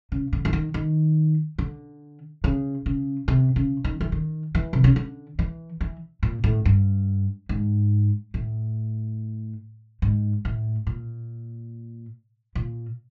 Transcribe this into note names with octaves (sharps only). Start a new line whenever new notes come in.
C#3
D3
E3
D#3
D#3
D3
C#3
C#3
C3
C#3
D#3
E3
D#3
E3
C3
C#3
D3
E3
E3
A#2
A2
G2
G#2
A2
G#2
A2
A#2
A#2